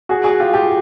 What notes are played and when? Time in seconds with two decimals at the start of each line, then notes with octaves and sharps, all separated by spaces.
0.09 F#4 G#4
0.24 F#4 G#4
0.40 F4 G4
0.54 F4 G4